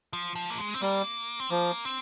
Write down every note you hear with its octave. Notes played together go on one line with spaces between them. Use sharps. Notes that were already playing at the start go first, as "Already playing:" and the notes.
F3
F3
A#3
G#3
C4
G3 A#3
C4
F3 A#3
C4